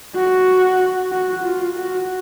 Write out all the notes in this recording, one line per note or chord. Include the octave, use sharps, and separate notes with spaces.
F#4
F#4
F4
F#4